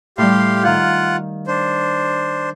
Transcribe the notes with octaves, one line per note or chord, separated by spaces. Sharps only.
A2 G3 G4 F5 C6
D#3 F4 F5 F#5 G6
D4 C5